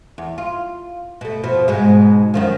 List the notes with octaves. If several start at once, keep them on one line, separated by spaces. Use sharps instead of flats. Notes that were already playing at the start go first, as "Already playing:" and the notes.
E2
F4
B2 A3
B2 F3
G#2 B2 G#3
F#2 D#3 F3